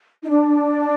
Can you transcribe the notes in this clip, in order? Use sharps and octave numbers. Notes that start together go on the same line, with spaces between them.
D#4
D4